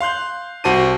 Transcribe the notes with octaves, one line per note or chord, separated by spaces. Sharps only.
F5 C6 F#6 G6
C2 F#4 C5 A5 D6 D#7